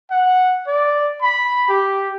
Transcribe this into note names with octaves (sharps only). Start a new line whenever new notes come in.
F#5
D5
B5
G4